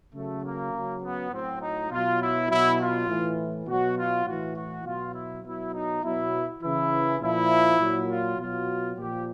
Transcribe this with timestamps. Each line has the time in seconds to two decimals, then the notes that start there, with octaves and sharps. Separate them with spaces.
0.13 C#3 F#3 A3
0.43 A#3
0.73 C#3 F#3
1.02 B3
1.31 A2 F#3 C4
1.61 D#4
1.90 B2 F#3 F4
2.20 E4
2.49 B2 F#3 E4
2.80 F4
3.08 A2 E3
3.67 B2 F#3 F#4
3.97 F4
4.26 A2 E3 F#4
4.55 F#4
4.84 B2 F#3 F4
5.14 E4
5.43 B2 F#3 E4
5.73 D#4
6.03 B2 F#3 E4
6.62 C#3 E3 E4
7.21 A#2 F3 E4
7.79 A#2 F#3
8.09 F4
8.38 B2 F#3 F4
8.98 A#2 F3 G4